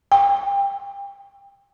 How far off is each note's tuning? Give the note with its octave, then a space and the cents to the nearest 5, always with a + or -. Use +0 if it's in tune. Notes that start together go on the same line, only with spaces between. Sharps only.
G5 +30